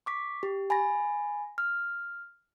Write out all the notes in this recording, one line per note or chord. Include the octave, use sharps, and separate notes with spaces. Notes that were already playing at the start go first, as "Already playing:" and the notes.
C#6 D6 B6
G4
G#5 B5 A6 A#6
F6